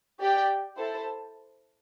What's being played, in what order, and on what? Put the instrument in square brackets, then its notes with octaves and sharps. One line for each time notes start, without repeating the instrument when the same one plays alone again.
[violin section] G4 D5 G5
E4 A4 C5 A5